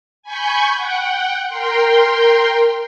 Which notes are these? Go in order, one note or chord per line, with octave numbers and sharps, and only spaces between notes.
G#5 B5 C#6 G6
F#5 G5
A#4 G5 C6